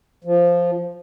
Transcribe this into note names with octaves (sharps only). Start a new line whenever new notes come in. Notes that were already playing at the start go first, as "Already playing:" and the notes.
F3